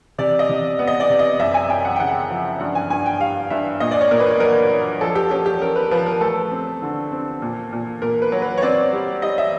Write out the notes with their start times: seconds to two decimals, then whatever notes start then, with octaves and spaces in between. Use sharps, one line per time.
0.18 C3 D5
0.39 D#5
0.49 C3
0.79 B3
0.87 D#5
1.00 D5
1.10 C3
1.19 D#5
1.39 F#2 E5
1.54 G#5
1.70 F#2 G5
1.85 F#5
1.96 G5
2.00 C#3 F#5
2.30 F3
2.60 G2 F#5
2.75 G#5
2.90 G2 G#5
3.06 G5
3.20 G3 F5
3.50 G2 E5
3.80 A#2 D#5
3.91 D5
4.01 C#5
4.11 A#2 A#4
4.20 B4
4.40 F#3 A#4
4.71 F#3
5.01 F3 A4
5.15 G4
5.30 C#4 G4
5.46 G4
5.61 C#4 A#4
5.76 B4
5.91 F3 B4
6.06 A#4
6.21 A3 A4
6.51 C4
6.82 D3
7.12 C4
7.42 A#2
7.73 A#2
8.02 A#2 A#4
8.22 B4
8.32 F#3
8.42 B4
8.58 C#5
8.62 C4 D5
8.93 G3
9.22 G3 D#5
9.38 E5